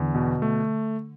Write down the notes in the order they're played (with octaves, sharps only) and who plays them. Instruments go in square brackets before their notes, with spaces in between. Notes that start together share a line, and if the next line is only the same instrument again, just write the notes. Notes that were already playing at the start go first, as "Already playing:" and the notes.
Already playing: [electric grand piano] E2 [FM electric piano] D3
[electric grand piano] B2
A3